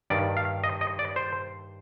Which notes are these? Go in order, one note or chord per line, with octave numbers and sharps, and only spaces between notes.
G2 D#3 D5
F5
D#5
D#5
D5
C5